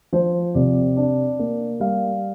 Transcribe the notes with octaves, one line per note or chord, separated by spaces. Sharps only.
F3 C5
C3 D5
D4
A#3
G3 F5